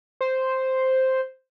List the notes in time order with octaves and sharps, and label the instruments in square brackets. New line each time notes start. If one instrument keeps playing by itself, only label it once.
[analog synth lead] C5